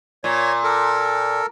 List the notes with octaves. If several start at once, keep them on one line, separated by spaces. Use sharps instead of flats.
A#2 C#5
A4 A#4